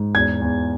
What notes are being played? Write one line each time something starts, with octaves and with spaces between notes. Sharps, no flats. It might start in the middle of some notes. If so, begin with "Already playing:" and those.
Already playing: G#2
E2 G#6
E2